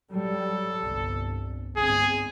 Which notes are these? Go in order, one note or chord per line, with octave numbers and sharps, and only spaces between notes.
G#2 F#3 G3 A4
G1 C2
G1 G#2 C4 G#4